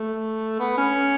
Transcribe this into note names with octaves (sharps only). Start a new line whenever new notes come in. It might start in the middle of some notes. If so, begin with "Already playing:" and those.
Already playing: A3
B3
C#4